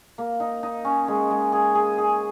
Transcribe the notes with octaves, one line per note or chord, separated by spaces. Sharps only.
A#3
D#4
D#4
C#4
G#3
G#3
G#4
G#4
G#4